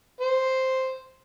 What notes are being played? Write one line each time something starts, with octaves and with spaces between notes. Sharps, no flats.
C5